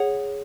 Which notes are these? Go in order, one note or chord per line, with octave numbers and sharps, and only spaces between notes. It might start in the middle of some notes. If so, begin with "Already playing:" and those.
Already playing: G#4 C#5 F#5